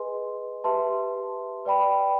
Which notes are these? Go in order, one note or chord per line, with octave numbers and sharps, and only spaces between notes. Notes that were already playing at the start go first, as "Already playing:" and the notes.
Already playing: G#4 B4 D#5 G#5 C6
G4 B4 E5 A5 C6
B4 D5 G5 B5